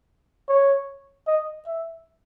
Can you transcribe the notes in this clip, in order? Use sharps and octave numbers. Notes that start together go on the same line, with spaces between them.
C#5
D#5
E5